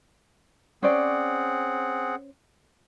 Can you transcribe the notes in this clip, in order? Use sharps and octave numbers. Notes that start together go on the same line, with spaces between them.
C4 C#4 G#4 C5 D5 F#5